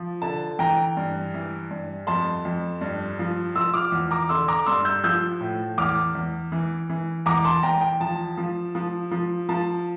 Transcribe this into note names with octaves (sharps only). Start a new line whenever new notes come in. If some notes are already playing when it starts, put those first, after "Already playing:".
Already playing: F3
D3 A5
E3 G5 A#5
G2
E3
G2
F2 A5 C6
F2
G2
F3
F3 C6 E6
D6 F6
E2
A#5 D6
D3 C6 E6
A#5 D6
G2 C6 E6
E6 G6
F3 E6 G6
A2
E2 D6 F6
E2
E3
E3
E2 A#5 D6
A5 C6
E2 G5 A#5
G5
F3 A5
F3
F3
F3
F3 A5